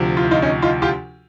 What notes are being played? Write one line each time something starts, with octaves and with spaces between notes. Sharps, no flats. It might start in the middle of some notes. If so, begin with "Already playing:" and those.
Already playing: D2 C3 F3
F4
E4
D#4 F4
C#4 D#4
D#4 F4
F4 G4